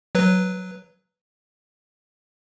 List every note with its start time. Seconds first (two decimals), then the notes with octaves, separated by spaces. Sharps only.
0.15 F#3 B4